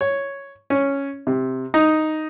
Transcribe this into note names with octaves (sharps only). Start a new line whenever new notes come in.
C#5
C#4
C3
D#4